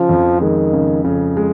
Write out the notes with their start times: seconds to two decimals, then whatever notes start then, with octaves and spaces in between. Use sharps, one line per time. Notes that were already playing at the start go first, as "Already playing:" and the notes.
Already playing: C#3 F3
0.09 F2
0.41 D#3 G#3
0.73 C#3
1.05 F2 C#3
1.37 G#3